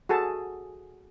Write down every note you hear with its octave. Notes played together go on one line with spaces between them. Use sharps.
F#4 G#4 A4 A5